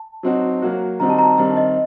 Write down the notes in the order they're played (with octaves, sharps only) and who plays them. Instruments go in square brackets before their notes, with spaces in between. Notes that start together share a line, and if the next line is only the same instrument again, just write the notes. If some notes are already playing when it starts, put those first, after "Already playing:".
Already playing: [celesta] A5
[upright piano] F#3 C4 D#4 F#4
F#3 A#3 F#4
[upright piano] D#3 G3 C4 D#4 F#4 [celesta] A#5
[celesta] A5
A#5
A#5
[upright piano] G2 D#3 G3 C4 [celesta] A5
[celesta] D#5